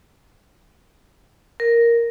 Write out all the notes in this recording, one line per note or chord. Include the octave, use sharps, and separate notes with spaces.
A#4